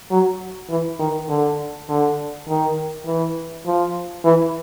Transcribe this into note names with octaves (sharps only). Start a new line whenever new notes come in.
F#3
E3
D#3
D3
D3
D#3
E3
F3
E3